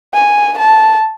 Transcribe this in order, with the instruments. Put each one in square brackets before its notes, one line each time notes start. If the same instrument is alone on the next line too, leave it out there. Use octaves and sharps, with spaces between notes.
[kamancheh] G#5
A5